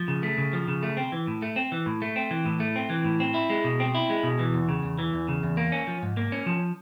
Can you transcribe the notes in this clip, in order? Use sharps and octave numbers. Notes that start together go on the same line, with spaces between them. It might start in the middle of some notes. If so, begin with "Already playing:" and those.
Already playing: F3
C#3
A3
C#3
F3
C#3
A3
C4
E3
A2
A3
C4
E3
A2
A3
C4
E3
A2
A3
C4
E3
A2
C4
E4
G#3
B2
C4
E4
G#3
B2
E3
E2
C#3
E2
E3
E2
C#3
E2
A#3
C#4
F3
G#2
A#3
C#4
F3